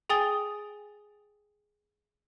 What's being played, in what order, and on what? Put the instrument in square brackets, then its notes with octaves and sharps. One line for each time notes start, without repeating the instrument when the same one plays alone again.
[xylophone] G#4 G5 G#5 D#6 A6 G7